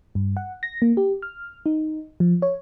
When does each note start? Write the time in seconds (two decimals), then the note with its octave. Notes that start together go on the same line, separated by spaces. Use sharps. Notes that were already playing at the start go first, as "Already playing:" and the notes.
0.15 G2
0.37 F#5
0.63 A#6
0.82 A#3
0.97 G4
1.22 F6
1.66 D#4
2.20 F3
2.42 C#5